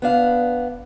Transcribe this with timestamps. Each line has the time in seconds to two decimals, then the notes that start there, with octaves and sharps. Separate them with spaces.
0.02 B3 D4 F5